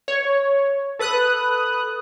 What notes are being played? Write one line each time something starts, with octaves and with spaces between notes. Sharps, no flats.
C#5
A4 B4 D#6 F#6